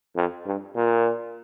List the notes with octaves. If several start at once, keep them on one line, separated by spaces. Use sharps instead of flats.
F2
G2
A#2